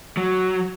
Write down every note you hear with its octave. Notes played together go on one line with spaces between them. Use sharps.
F#3